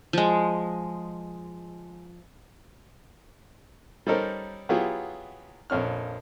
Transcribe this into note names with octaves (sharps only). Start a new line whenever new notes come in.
F3 G#3
G3 C#4 D#4 A4 A#4 C5
F#3 B3 E4 F4 G4 G#4
A#1 F2 C#4 F6